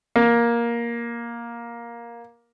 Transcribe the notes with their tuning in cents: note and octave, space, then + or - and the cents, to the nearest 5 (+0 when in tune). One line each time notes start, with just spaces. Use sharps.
A#3 +10